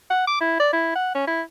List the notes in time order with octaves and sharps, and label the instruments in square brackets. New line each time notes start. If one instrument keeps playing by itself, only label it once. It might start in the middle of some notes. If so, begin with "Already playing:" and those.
[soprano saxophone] F#5
D6
E4
D5
E4
F#5
C#4
E4